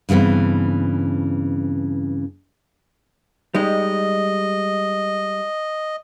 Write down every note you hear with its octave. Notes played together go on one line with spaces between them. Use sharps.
G2 C#3 E3 B3 C4
G3 G#3 D#4 D#5